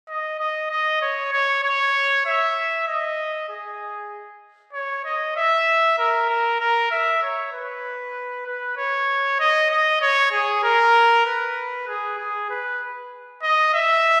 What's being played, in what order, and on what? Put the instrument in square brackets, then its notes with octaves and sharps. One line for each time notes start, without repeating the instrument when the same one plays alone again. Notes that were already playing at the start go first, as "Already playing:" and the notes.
[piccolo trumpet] D#5
D#5
D#5
C#5
C#5
C#5
E5
D#5
G#4
C#5
D#5
E5
A#4
A#4
A#4
E5
C#5
B4
B4
C#5
D#5
D#5
C#5
G#4
A#4
B4
G#4
G#4
B4
D#5
E5